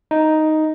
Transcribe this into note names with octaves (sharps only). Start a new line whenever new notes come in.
D#4